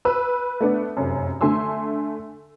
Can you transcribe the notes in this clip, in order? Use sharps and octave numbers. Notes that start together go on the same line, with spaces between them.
B4 E6
A3 B3 D4
F1 F#2
D3 A3 G#5 C6 E6